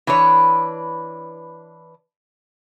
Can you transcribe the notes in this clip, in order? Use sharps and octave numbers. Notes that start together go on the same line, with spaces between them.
E3 D4 B4 C#5